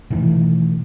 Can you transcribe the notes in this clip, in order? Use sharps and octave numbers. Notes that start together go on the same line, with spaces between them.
B2 D#3 E3 A3